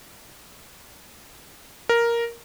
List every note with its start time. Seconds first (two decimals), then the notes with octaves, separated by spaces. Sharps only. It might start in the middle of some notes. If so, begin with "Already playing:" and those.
1.89 A#4